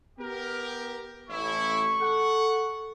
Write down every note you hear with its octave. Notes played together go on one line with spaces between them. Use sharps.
B3 G4 A#4
A1 E4 C#6
A4 F#5